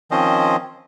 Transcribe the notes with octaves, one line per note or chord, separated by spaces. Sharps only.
D#3 F3 C4 C#4 C5 D#5